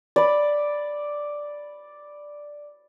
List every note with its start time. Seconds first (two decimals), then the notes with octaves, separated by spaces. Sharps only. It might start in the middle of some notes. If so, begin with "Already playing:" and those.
0.16 D5 B5